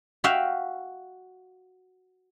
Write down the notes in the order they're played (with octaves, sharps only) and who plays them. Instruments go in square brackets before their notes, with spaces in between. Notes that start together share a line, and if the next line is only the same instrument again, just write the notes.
[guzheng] F#4 E5 F5 G5